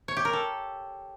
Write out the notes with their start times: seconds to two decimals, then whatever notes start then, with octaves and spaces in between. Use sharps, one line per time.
0.08 C#5
0.17 G4
0.25 A#4
0.33 A4